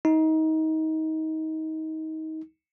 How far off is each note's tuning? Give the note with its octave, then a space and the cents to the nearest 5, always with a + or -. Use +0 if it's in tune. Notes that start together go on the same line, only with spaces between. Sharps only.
D#4 +25